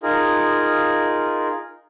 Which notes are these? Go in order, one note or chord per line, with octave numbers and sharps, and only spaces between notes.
D#4 F4 G#4 A#4